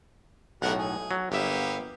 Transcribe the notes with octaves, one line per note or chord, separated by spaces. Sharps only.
B1 A2 G3 A#4 F#5
G#4
F#3
G1 A#3 B3 G4 E5